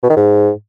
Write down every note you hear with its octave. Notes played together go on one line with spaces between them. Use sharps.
B2
D#3
G#2